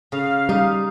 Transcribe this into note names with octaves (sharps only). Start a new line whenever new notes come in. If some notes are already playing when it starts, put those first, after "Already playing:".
C#3 F5
G3 D#4